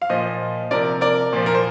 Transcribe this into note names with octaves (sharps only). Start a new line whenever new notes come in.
F5
A#2 F3 C5 D#5
C3 F3 A#4 D5
A#4 D5
A#2 F3
A#4
C5